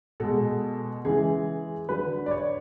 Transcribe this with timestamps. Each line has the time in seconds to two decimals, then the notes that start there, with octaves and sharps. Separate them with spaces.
0.20 B2 G#3 A4
1.04 C#3 E3 G#3 G#4
1.89 D3 F#3 B4
2.26 D5
2.31 C#5